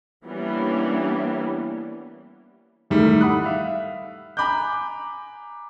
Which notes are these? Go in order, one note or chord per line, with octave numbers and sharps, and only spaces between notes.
E3 G3 A#3 B3 C#4 D4
E2 G#2 D#3 G3 A3
F#5 B5 D#6 F#6
E5 F5
G#5 A#5 B5 D6 F#6 G6